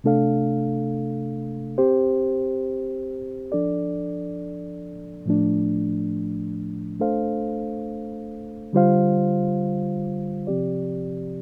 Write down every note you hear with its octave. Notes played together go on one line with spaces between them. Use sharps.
C3 A3 D4 A4 F5
C4 G4 C5
F3 D4 A4 D5
A2 F3 A3 D4
A3 D4 A4 C5 F5
D3 G3 F4 C5 F5
C3 F3 C4 G4 D5